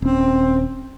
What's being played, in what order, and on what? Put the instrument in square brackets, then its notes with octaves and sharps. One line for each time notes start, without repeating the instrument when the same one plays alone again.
[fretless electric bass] D#1 C#4 [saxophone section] C4